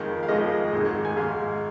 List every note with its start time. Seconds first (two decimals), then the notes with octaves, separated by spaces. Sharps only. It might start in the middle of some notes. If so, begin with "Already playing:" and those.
Already playing: F2 D#3 G#3
0.23 F5
0.28 F2 D#3 G#3 D#5
0.72 G#1 G#2 G#3 D#4
1.05 G#5
1.17 G#1 G#2 G#3 D#4 F5